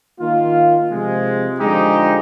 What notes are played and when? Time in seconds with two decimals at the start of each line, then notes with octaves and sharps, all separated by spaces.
0.20 D#3 A#3 F4
0.91 C3 F3 G#3
1.61 D3 F3 G#3 D#4 G4